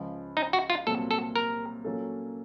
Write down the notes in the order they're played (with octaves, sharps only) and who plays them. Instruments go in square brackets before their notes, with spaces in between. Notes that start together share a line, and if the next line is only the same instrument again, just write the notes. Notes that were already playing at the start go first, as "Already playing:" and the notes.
Already playing: [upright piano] C#2 C#3 F3
[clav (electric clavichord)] D#4
F#4
F4
[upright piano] C2 A#2 F#3 C4 [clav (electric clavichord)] A4
[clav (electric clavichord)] A4
A#4
[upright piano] A#2 F#3 A#3 C#4 A4